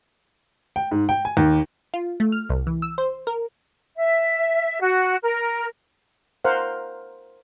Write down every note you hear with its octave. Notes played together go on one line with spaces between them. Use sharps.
G5
G#2
G5
G#5
D#2
F4
A3
F6
C2
E3
E6
C5
A#4
E5
F#4
A#4
A#4 C5 F5 F#5